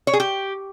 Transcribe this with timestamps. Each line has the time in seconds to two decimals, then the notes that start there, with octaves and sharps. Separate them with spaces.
0.07 C#5
0.13 G#4
0.20 G4